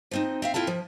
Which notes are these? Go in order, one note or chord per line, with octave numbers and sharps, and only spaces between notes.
F3 C4 D#4
C4 E5 F5
C4 E4 F4 A4 A5
F3